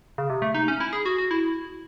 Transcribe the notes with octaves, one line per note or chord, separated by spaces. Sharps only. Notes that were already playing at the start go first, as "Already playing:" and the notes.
C#3
C3
A3
D#4
C#4
E4
G#4
F#4
F#4
E4